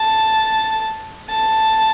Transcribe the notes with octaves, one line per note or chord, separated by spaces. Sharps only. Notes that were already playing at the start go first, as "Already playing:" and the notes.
Already playing: A5
A5